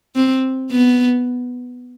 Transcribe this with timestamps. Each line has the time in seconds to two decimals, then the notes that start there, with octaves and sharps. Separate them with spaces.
0.16 C4
0.71 B3